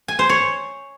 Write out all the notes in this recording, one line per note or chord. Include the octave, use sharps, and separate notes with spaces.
G#5
C5
C#5